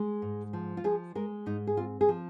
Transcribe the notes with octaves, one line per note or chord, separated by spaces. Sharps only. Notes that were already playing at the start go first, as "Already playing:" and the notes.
Already playing: G#3
G#2
F3
F4
F3 G#4
G#3 A#4
G#2 D#4
G#4
C4 F4
G#4
F3